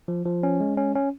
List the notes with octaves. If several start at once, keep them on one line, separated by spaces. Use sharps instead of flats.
F3
F3
C#4
G#3
C#4
C#4